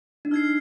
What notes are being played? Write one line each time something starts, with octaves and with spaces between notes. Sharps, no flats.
D4
D#4 F6 G#6 C7